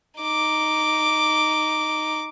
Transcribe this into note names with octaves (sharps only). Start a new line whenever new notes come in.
D#4 D6